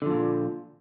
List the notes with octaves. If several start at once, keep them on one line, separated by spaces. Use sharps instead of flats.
A#2 D3 F3